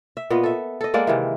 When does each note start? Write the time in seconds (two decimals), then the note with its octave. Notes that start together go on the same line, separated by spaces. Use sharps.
0.17 E5
0.30 A#2 B3 D#5
0.43 A4 E5
0.81 A4 D#5
0.94 G#3 A#3 D5 F#5
1.07 C3 D#3 E3